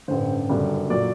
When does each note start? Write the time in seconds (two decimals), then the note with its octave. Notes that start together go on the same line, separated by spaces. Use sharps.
0.08 A1 G2 D3 C5
0.49 F#1 F#2 D3 G3
0.90 A#2 F#3 D5